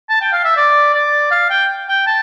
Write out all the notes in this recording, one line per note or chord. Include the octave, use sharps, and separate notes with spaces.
A5
G5
F5
E5
D5
D5
F5
G5
G5
A5